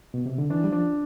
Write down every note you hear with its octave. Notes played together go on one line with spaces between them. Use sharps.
B2
C3
D3
E3 D4
G3
F3 D4